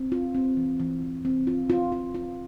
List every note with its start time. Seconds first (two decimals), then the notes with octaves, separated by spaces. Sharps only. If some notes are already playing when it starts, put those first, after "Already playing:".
Already playing: C4
0.12 F4
0.35 C4
0.57 E3
0.80 E3
1.02 E3
1.25 C4
1.47 F4
1.70 F4
1.92 F4
2.15 F4